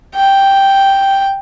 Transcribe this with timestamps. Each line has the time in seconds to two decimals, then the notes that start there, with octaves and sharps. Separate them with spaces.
0.15 G5